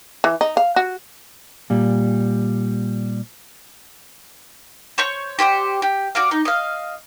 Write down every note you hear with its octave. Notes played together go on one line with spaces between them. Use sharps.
E3
D#4
F5
F#4
A#2 G3
C5 C#5 C#6 G6
G4 C5 D5 F#5
G4
F#4 D5 F5
D#4
D#5 F5